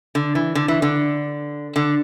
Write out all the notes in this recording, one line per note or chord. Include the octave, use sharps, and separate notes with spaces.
D3
E3
D3
E3
D3
D3